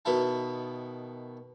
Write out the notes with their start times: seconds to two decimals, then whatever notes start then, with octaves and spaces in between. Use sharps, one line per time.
0.05 B2 D#3 B3 E4 E5 A5